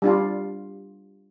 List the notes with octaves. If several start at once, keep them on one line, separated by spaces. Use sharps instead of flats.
G3 D4 F4